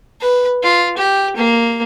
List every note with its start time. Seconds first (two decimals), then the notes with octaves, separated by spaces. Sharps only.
0.21 B4
0.63 F4
0.97 G4
1.36 A#3